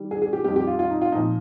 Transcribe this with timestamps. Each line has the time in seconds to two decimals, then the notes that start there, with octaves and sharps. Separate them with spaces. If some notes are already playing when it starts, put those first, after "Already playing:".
Already playing: D#3 G3
0.11 G#4
0.22 G#4
0.33 G4
0.44 F2 D#3 G3 G4
0.56 G4
0.67 F4
0.79 F4
0.90 D#4
1.01 F4
1.12 A#2 F3 D#4